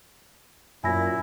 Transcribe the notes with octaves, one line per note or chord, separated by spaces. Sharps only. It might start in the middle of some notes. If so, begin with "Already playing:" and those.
F#2 A#2 E4 G#5 A#6